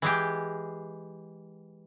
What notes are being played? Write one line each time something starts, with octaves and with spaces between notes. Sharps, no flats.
E3 G#3 G4